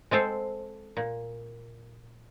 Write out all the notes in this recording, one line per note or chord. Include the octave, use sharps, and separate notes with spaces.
G#3 C4 A4 C5
A#2